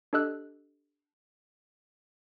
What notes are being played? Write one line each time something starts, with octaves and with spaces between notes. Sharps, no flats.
D4 G4 A4 D#5 E6 F#6